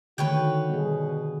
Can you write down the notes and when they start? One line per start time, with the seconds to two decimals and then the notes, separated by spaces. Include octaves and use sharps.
0.18 D3 D#3 A3 F#4 B4 C#5 G5
0.70 B2 G3 G#4